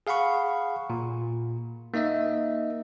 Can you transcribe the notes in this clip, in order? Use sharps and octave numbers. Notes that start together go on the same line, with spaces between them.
G#4 F5 F#5 B5 C#6
A#2
A#3 D#4 D#5 E5